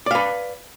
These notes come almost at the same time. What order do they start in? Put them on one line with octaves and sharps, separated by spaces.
D5 F5 B4